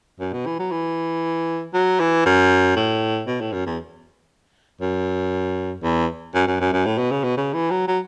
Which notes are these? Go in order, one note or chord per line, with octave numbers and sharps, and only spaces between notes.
F#2
B2
E3
F#3
E3
F#3
E3
F#2
A2
B2
A2
F#2
E2
F#2
E2
F#2
F#2
F#2
F#2
A2
B2
C#3
B2
C#3
E3
F#3
F#3